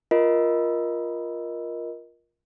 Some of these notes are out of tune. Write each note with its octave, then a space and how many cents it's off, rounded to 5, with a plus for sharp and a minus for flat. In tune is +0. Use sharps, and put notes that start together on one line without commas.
F4 +0 A#4 +15 D#5 +10